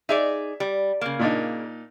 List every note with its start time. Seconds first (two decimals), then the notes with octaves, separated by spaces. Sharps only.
0.09 D#4 G#4 D5 E5
0.60 G3
1.01 C#3 A#3
1.19 A#2 D4 D#4